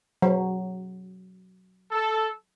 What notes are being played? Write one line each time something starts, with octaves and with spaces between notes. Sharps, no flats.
F#3
A4